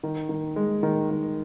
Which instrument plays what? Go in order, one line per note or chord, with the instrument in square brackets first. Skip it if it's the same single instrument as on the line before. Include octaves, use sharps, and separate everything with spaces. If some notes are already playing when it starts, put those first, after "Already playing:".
[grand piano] D#3
D#3
G#3
D#3
D#3